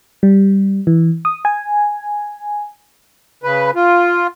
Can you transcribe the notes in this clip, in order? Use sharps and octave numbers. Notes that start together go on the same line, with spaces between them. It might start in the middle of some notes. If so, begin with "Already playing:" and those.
G3
E3
D#6
G#5
C#3 B4
F4